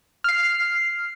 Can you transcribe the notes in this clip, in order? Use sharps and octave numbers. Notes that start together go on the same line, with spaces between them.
F6 C7